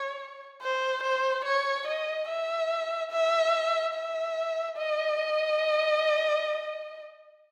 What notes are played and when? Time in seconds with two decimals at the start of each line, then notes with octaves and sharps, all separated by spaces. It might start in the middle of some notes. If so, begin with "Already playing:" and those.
Already playing: C#5
0.61 C5
1.03 C5
1.44 C#5
1.87 D#5
2.28 E5
3.11 E5
3.94 E5
4.77 D#5